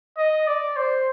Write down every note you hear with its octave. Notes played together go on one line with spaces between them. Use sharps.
D#5
D5
C5